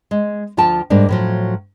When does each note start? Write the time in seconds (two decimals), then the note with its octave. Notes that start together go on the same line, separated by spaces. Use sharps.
0.11 G#3
0.57 D2 F3 F4 G5 A5
0.90 G#2 G3 A#3 D4
1.09 A2 F3 F#3